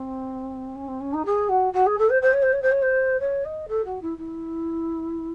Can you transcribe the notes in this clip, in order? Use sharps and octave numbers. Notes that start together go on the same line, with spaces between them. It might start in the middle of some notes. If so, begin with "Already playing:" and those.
Already playing: C4
C#4
C4
C#4
D#4
G#4
F#4
F#4
G#4
A4
C5
C5
C#5
C5
C#5
C5
C#5
C5
C#5
D#5
A4
F#4
E4
E4